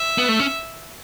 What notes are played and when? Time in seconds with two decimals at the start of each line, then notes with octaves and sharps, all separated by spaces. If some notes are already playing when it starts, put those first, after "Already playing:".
Already playing: E5
0.18 B3
0.29 A3
0.39 C#4